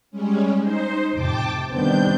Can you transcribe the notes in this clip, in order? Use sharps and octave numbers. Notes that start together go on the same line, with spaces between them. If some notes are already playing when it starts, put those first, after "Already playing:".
G3 G#3 C#4
D#4 C5
F2 A2 C3 G5 A5 D6
D#3 G3 B3 C4 D4 G6